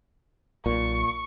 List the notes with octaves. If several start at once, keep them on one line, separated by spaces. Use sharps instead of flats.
B1 A#2 C#6